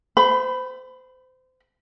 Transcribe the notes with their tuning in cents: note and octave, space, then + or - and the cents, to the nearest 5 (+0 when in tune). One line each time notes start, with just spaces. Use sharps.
C5 -30 B5 +10